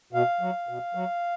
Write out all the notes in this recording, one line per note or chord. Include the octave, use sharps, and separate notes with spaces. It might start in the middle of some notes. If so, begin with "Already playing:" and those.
B2 F5
F#3
B2
F#3